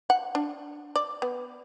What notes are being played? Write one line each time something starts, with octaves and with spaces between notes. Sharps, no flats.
F#5
D4
D5
B3